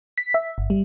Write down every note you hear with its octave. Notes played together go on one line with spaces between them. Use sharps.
B6
E5
G1
G3